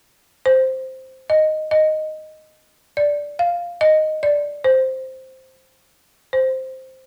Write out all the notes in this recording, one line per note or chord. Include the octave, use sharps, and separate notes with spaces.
C5
D#5
D#5
D5
F5
D#5
D5
C5
C5